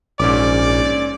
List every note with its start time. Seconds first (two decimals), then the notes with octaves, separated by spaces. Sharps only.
0.20 A#1 G#2 C#4 D5 D6